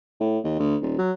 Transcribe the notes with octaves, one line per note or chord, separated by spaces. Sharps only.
A2
D#2
D2
D#1
F#3